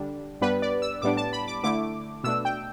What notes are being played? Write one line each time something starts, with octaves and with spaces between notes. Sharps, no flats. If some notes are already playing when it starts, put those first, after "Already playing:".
Already playing: D3 G3 D4
G2 G3 B3 D4 B4
D5
E6
A2 G3 B3 D4 D6
A5
B5
D6
D3 A3 E4 D6
B2 A3 D4 E6
G5